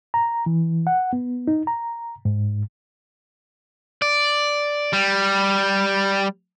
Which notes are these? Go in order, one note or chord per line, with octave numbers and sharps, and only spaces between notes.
A#5
E3
F#5
B3
D#4
A#5
G#2
D5
G3